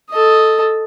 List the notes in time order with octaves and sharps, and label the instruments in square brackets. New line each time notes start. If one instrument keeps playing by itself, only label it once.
[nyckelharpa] A4 D#5